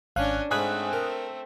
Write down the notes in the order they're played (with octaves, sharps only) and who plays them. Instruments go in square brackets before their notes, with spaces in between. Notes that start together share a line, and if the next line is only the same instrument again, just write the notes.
[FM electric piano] G#1 F5 F#6 [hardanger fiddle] C#4 D4
[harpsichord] G#2 C#4 B5 [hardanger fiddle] A3 C4 [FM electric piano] G#5 D#6 F#6
[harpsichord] A#4